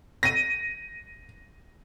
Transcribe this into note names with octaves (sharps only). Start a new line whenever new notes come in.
A#6 D#7